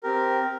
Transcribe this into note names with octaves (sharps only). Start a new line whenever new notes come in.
C4 G4 A#4
C4